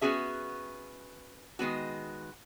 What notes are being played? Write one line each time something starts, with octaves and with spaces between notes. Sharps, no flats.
B3 C#4 F#4 G#4 E5
D#3 G#3 B3 F#4